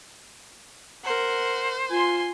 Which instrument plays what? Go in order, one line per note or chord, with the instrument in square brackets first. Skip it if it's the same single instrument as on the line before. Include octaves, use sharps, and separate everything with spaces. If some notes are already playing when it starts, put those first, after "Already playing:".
[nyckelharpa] A#4 F#5 [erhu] C5
[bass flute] F4 [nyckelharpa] G#5 C6